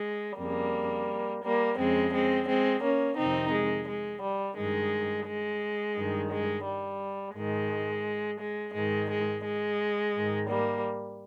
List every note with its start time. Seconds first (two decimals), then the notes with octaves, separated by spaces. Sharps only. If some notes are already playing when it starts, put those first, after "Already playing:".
Already playing: G#3
0.38 F2 C#3 G3 A#3
1.43 G3 A#3
1.77 F2 C#3 G#3 C4
2.12 G#3 C4
2.47 G#3 C4
2.83 A#3 C#4
3.16 F2 C3 D#3 C4 D#4
3.51 G#3
3.87 G#3
4.21 G3
4.57 G2 D#3 G#3
5.25 G#3
5.96 G2 D#3
6.31 G#3
6.65 G3
7.34 G#2 D#3 G#3
8.39 G#3
8.73 G#2 D#3 G#3
9.09 G#3
9.44 G#3
10.14 G#2 D#3
10.48 G3 A#3